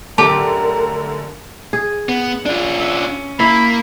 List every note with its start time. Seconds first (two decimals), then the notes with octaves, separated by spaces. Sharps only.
0.18 F#2 A2 D3 G4 A#4 A5
1.73 G#4
2.09 B3
2.46 C#4 D4 F4
2.80 E5
3.40 A#3 E4 B5